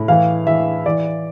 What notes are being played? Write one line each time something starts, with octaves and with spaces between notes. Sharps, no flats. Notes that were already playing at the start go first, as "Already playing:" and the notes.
Already playing: A2
E3 F5
E3 E5
E3 D5